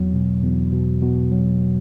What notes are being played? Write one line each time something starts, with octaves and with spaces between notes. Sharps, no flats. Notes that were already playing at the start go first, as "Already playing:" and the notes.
Already playing: E2 F#3
B2
E2
B2
B2
F#3